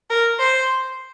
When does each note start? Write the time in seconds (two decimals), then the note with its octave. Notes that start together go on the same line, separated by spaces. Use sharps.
0.10 A#4
0.39 C5